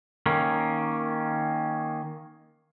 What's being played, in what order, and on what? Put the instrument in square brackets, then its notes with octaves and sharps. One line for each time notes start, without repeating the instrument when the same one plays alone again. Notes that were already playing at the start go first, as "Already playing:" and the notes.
[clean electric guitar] D#3 A#3 C#4